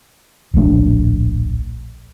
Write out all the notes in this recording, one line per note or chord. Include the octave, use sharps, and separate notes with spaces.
D1 A#1 A3 D4